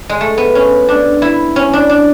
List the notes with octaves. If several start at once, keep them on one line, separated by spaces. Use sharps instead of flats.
G#3
A3
B3
C#4
D4
E4
C#4
D4
D4